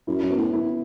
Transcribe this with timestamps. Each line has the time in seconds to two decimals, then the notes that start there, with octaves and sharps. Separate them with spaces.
0.07 F#2 E4
0.23 F#2
0.30 B3
0.38 A2
0.53 E4